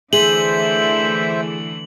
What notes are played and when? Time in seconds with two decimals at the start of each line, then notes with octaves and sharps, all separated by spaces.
0.13 D3 E3 A3 G#4 C5 E5 F#7